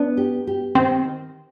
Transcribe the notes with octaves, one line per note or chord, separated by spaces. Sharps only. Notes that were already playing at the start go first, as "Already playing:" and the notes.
Already playing: B3 D4
G4
G4
D#3 C4